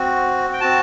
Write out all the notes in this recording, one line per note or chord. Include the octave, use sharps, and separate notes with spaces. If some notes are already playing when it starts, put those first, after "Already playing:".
Already playing: C4 F#4
G5
C4 F#4 A5